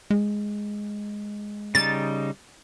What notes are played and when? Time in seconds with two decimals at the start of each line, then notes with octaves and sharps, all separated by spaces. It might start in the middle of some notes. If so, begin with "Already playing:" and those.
0.10 G#3
1.75 C#3 G3 D#4 A6